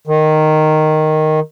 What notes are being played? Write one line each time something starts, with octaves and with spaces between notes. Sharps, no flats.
D#3